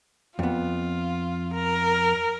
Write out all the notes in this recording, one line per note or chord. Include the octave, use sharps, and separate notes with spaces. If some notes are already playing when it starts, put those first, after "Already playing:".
F2 B3 F4
A#4